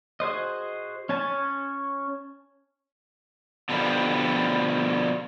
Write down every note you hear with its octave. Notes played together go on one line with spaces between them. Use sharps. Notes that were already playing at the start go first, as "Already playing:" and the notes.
F#4 G#4 C5 D#5
C#4 C#5 G#5 A5
B2 D3 F3 G3